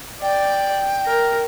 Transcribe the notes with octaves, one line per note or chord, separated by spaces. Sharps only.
D5 G5
A#4